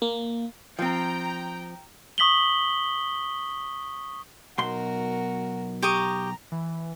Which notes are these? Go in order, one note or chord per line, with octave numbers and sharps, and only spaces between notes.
A#3
F3 C4 G5 A#5
C#6 D#6 B6 F#7 G7
B1 F#4 A#4 C6
G4 A#5 C#6 D#6
E3